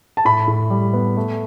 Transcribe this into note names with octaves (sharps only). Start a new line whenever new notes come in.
A5
A2 B5
A2
G3
B3
A3